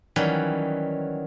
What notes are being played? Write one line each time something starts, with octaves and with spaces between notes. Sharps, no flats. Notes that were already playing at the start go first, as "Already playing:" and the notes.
D#3 E3 F#3 G3 C#4